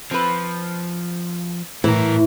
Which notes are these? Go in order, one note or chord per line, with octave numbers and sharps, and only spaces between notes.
F3 C4 B4
A2 E3 E4 A#4